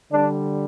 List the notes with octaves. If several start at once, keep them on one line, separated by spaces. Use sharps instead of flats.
D3 G3 D4